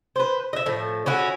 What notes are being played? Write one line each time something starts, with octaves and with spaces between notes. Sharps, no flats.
B4 C5
D#5 E5
A2 F3
C#4 E4 F#4 G#4